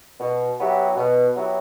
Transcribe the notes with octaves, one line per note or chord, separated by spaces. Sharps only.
B2
F#3 B3 E4 G4
B2
F#3 B3 E4 G4